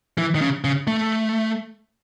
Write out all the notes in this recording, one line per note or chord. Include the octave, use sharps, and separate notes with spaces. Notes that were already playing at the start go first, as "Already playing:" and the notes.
E3
D#3
C#3
C#3
A3